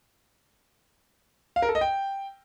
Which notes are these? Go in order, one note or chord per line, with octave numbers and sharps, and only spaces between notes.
F5
A#4
A4
D#5
G5